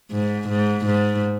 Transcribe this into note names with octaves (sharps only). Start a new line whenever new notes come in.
G#2
G#2
G#2